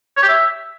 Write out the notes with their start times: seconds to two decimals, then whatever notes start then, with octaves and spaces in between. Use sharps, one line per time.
0.17 C#5
0.23 G4
0.29 E5